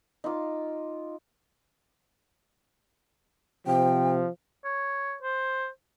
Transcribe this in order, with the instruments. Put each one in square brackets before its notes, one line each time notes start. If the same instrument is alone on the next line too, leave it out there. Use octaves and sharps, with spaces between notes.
[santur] D#4 F4 C6 D6
[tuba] C3 [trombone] F3 [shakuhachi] G5
[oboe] C#5
C5